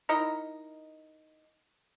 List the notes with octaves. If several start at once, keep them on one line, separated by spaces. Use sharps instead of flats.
D#4 E4 A#4 D#5